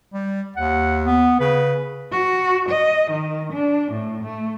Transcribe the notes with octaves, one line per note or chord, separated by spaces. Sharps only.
G3
D#2 F#5
B3
C#3 B4
F#4
D#5
D#3
D4
A2
A3